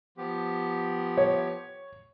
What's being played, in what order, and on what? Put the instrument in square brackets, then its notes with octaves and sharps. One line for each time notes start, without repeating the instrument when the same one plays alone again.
[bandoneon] F3 B3 G4
[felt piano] C#5